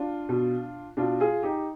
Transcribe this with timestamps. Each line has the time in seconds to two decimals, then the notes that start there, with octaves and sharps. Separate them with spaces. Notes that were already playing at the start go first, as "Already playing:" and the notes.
Already playing: D4 F4
0.29 B2
0.97 B2 D4 F4
1.20 F4 G#4
1.43 D#4 G4